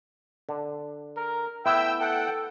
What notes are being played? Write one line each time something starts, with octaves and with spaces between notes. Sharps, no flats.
D3
A#4
A3 B3 E4 E5 G5 E6
A4 F#5 G5